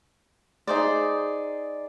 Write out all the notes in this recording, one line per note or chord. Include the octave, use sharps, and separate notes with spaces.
D#4 G#4 C5 D5